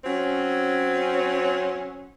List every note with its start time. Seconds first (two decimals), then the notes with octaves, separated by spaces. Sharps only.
0.05 F#3 C4 C#4